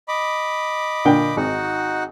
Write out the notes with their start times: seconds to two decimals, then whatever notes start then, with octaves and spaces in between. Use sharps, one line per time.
0.08 D#5 B5 D6
1.05 A#2 D3 G5
1.37 G#1 D#4 F#4 F#5